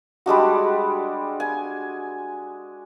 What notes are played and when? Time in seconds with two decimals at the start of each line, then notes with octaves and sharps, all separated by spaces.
0.26 G3 G#3 D4 F#4
1.40 G#5